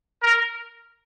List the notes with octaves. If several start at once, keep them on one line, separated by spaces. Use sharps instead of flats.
A#4